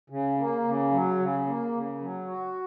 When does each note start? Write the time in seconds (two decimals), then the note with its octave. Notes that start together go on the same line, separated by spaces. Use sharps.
0.10 C#3
0.37 A#3
0.64 C#3
0.92 F#3
1.19 C#3
1.46 A#3
1.73 C#3
2.01 F#3
2.28 F#4